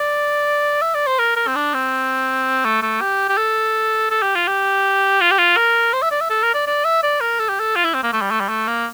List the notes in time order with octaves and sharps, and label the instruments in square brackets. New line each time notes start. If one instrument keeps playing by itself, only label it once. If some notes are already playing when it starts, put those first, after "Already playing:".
Already playing: [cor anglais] D5
E5
D5
C5
A#4
A#4
C4
D4
C4
A3
A3
G4
G4
A4
A4
G4
F4
G4
F4
G4
F4
A#4
C5
E5
D5
E5
A4
A#4
D5
D5
E5
D5
A#4
A4
G4
A4
F4
E4
C4
A#3
A3
G3
A3
G3
A3
A#3